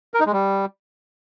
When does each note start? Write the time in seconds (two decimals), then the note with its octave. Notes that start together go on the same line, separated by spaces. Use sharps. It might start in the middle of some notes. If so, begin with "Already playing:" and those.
0.14 A#4
0.20 D#4
0.26 G#3
0.33 G3